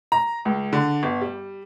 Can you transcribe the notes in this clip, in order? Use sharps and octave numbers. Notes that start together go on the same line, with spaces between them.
A#5
C#2
D3
G1
G3